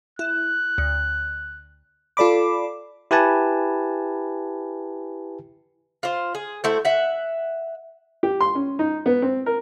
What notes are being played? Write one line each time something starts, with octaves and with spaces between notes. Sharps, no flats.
E4 F#6
D2
F4 A4 D5 B5 D6
E4 G4 B4 G#5 A5
F4 C5
G#4
A3 E4 F#4 C5
E5 F#5
G4
C6
C#4
D#4
B3
C4
A#4